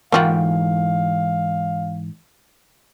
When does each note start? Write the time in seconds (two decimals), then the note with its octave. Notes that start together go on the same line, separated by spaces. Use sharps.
0.12 G#2 E3 A#3 F4 F#4 F5 G5